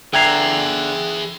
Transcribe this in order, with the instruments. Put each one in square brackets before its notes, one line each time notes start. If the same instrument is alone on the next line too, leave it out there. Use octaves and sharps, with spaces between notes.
[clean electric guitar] D3 A#5 [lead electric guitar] G#4 E5 [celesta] G5 G#6 C7